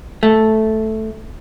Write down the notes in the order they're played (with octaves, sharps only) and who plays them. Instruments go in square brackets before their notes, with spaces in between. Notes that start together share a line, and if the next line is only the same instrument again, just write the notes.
[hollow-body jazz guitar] A3